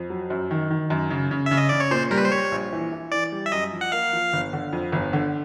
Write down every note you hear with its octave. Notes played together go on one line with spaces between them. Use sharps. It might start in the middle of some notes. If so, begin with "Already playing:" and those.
Already playing: F2
F#3
F#2
D#3
D#3
F#2
C#3
C#3
C#3 E5
D#5
C#3 D5
C#5
A#2 C5
G3 A#4
B4
C5
G3 C#5
A#1
E3
E3
E3 D5
G3
E5
F#2 D#5
F3
F#5
A#3 F5
F3
G1
D3
F2
G1
D3